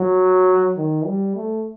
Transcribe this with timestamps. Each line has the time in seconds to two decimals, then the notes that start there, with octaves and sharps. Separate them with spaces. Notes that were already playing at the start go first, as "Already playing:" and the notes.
Already playing: F#3
0.78 D#3
1.06 G3
1.36 A3